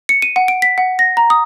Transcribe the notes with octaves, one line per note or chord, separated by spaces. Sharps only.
C#7
D#7
F#5
D7
B6
F#5
A#6
A#5
D#6